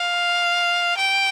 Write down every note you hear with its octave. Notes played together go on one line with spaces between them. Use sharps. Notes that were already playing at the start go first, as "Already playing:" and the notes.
Already playing: F5
G5